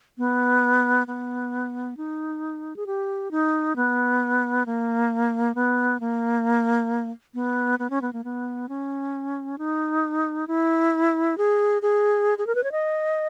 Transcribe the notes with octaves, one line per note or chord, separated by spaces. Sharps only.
B3
B3
D#4
G#4
G4
D#4
B3
A#3
B3
A#3
B3
B3
C#4
B3
A#3
B3
C#4
D#4
E4
G#4
G#4
G#4
A#4
B4
C#5
D#5